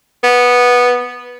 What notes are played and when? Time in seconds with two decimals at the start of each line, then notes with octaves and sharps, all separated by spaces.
0.23 B3